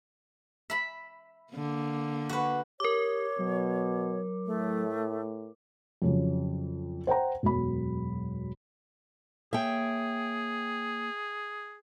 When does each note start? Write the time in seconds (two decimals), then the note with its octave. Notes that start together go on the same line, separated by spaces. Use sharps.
0.70 E5 B5
1.53 D3 A#3
2.29 F#4 B4
2.80 G4 A#4 C#5 D6
3.39 B2 F#3
4.46 A2 A3
6.02 F2 C#3 F#3
7.07 C5 F#5 G5 A#5
7.43 E1 F#2 F#3 B5
9.53 A#3 G#4 C#5 E5 G5